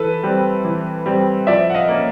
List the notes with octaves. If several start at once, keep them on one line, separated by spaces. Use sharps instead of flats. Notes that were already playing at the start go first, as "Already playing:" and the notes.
Already playing: E3 A4 B4
G3 C4
E3
G3 C4
F3 D5 E5
F#5
D#5 F5
A#3 C#4